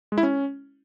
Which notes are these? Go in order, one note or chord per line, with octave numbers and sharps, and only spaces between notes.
G#3
E4
C#4